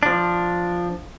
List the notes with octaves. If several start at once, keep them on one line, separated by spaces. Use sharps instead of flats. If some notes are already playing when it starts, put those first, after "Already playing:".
F3 D4